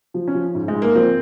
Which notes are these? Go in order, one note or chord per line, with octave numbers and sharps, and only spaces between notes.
F3
C#4
F3
G#2
G#3
G#2
A#3
F3 C4